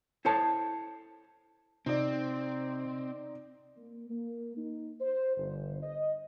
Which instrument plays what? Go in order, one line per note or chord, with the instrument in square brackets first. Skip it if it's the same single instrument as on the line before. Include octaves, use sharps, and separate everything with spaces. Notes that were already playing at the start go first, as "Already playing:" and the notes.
[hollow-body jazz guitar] E4 A4 C5 C#5 A5
[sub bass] C3 [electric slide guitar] C4 [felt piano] D#4 D5
[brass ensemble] A#3
A#3
D#4
C5
G1
D#5